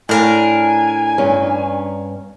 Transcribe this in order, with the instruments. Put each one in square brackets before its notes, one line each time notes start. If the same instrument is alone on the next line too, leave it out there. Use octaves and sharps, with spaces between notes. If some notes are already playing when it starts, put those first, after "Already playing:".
[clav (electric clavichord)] A2 [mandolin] D4 A#4 F5 [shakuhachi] G#5
[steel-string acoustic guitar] G2 C#4